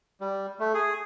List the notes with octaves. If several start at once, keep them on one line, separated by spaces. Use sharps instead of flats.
G3
A3
G#4